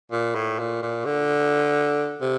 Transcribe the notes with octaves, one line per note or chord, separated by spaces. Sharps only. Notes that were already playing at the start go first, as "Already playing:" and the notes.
A#2
A2
A#2
A#2
D3
C3